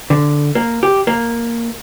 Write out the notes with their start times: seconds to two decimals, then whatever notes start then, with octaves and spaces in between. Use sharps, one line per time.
0.10 D3
0.55 A#3
0.83 G4
1.07 A#3